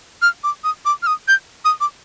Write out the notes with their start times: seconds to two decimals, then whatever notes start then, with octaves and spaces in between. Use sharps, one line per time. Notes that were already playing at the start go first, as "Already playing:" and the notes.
0.22 F6
0.44 D6
0.64 D#6
0.85 D6
1.03 F6
1.07 D#6
1.28 G6
1.65 D#6
1.81 D6